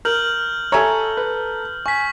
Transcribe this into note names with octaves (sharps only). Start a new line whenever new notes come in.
A#4 F6 G6 F#7
A4 C#5 E5 G#5 A#5
B4
G#5 C#6 B6